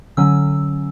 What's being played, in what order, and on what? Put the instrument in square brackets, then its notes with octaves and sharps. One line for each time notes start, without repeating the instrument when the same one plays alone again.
[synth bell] D3 F#3 C#4 E6